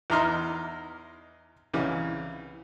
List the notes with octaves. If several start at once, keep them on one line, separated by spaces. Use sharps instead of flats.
E2 D#4 E4 A#5 C6 F6
C2 C#3 E3